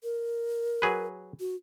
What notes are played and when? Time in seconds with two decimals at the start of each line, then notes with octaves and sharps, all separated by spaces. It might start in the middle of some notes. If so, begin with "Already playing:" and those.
0.04 A#4
0.82 F#3 G#4 B4
1.40 F#4